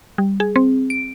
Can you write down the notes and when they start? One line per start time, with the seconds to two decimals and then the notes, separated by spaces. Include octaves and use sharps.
0.18 G3
0.40 G#4
0.56 C4
0.90 D7